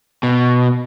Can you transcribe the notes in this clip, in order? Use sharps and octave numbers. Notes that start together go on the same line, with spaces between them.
B2